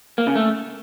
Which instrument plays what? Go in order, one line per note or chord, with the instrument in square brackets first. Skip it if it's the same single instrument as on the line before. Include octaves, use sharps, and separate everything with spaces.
[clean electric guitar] A#3
C#3
A3